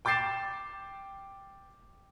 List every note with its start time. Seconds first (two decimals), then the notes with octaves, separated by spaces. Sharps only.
0.05 G5 D6 G6 A6 C7 E7